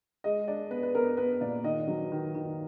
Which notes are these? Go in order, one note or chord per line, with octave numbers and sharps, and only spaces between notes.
G#3 D#5
D4 D5
B3 B4
B4
B3 A#4
B3 B4
A#2 D5
D#3 D#5
F#3
D#3
D#3